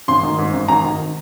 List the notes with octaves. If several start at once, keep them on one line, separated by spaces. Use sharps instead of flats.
G#1 C6
D#3
G#2
G#1
G#1 A#5
D#3